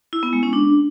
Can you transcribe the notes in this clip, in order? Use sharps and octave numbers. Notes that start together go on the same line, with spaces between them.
E4
B3
G#3
C#4
D4